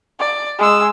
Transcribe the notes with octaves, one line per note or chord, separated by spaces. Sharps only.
D5
G#3 E6